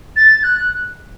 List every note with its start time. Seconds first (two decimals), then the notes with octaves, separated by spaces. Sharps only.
0.16 A6
0.44 F#6